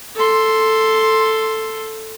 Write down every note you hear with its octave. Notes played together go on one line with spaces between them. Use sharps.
A4 C6